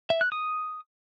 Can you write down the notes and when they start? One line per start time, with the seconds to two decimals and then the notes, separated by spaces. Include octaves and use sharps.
0.10 E5
0.21 F#6
0.32 D#6